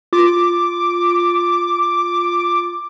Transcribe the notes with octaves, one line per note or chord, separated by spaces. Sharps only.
F4 D6